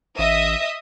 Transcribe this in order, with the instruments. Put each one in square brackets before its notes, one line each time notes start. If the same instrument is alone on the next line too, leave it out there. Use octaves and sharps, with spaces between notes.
[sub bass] A1 [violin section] D#5 E5 D#6